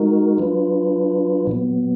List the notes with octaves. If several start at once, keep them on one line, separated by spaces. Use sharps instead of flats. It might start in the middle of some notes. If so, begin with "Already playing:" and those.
Already playing: G#3 D#4 F#4 A#4
F#3 D4 F4 B4
A#2 F#3 B3